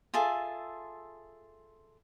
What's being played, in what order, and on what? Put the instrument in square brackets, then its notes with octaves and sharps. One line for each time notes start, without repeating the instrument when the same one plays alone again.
[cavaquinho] F4 G#4 A4 E5